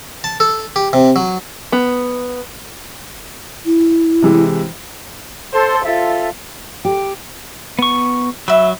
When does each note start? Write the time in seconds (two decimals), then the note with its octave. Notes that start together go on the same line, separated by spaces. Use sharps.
0.24 A5
0.40 A4
0.76 G4
0.93 C3
1.16 F#3
1.72 B3
3.65 E4
4.22 C3 E3 G#3
5.53 A4 C5 C6
5.85 F4 A4 E5
6.85 G4
7.79 B3 C#6
8.48 F#3 E5 B5